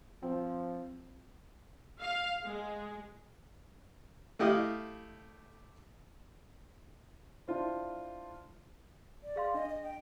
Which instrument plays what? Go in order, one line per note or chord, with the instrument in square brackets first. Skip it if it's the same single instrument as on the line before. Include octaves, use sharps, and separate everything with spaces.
[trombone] F3 [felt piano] C4
[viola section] F5
G#3
[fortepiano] A3 E4 G4 D#5 F5
[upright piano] D4 E4 F4 C5
[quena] D5
[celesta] G#4 F5 C6
[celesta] D4 [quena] D#5
[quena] D#5
G5